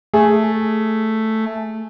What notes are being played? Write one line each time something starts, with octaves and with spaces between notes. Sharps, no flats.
A3 G#4